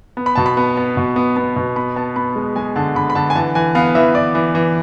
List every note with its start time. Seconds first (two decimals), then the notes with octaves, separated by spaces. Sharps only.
0.17 B3
0.26 B5
0.36 B2 A5
0.46 B5
0.57 B3
0.77 B3
0.97 B2
1.16 B3
1.37 B3
1.56 B2
1.76 B3 B5
1.96 B3 A5
2.16 B3 B5
2.36 G#3
2.56 G#3 G#5
2.76 D3 A5
2.95 D3 B5
3.10 B5
3.15 D3 A5
3.30 G#5
3.35 E3 A5
3.55 E3 G#5
3.75 B3 F5
3.95 E3 E5
4.15 E3 D5
4.35 E3
4.55 E3